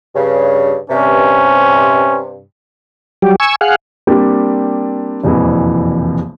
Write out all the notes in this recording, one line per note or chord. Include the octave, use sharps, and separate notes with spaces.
G2 C#3
G2 C3 C#4
F#3 G3 G4
G#5 C#6 E6
G#4 F5 F#5
G3 A#3 C4 D4 G4
E1 A#1 F2 C3 E3